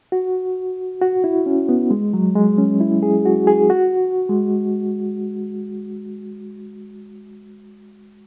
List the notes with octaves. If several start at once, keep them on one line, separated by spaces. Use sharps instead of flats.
F#4
F#4
E4
C#4
B3
G#3
F#3
G#3
C#4
E4
G#4
F#4
G#4
F#4
G#3